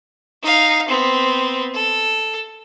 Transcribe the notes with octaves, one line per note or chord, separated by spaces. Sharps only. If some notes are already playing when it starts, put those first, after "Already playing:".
D#4 F5
B3 C4
A4